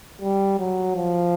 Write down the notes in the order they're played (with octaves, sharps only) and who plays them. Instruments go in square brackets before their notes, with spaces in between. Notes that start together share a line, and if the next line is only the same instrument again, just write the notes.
[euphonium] G3
F#3
F3